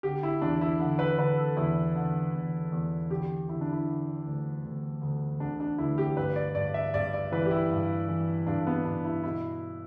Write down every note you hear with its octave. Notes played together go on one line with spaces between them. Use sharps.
D3 G4
E4
E2 D4
E4
D3
B4
D3 B4
A4
E2 E4
D3
E2
E2
D3 G4
D3 E4
D4
E4
D3
D2
D2
D2
D3 D4
D4
D2 E4
G4
G2 B4
D5
G2 D5
E5
G2 D5
D5
E3 B4
G4
E4
G2
E3
G2 D4
B3
G2 D4
E4
B2 E4